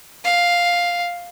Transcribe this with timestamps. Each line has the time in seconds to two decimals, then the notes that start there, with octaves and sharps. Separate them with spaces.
0.24 F5